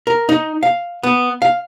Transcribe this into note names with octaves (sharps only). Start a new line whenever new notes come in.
A#4
D#4
F5
B3
F5